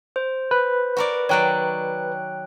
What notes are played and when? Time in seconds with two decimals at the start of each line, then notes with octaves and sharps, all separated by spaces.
0.16 C5
0.51 B4
0.97 F#4 A#4 D5
1.29 D#3 F#3 C#5 D5 G5 F#6